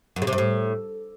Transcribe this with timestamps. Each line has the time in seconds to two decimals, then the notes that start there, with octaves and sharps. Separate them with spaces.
0.16 F#2
0.22 C#3
0.27 C3
0.33 G2
0.38 A2